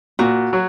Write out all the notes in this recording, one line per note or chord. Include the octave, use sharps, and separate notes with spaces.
A#2 F#4
F#3